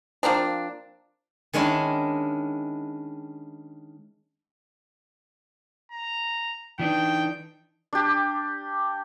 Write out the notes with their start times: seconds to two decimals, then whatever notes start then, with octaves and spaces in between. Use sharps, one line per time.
0.23 F3 A#3 C4 D4
1.53 D#3 G#3 C#4 D4 E4
5.92 A#5
6.79 E3 D4 D#4 G5
7.93 D4 G4